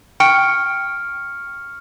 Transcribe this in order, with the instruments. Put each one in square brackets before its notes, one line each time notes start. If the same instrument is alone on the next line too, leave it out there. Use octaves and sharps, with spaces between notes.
[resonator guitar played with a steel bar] G5 [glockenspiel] C#6 F6 C#7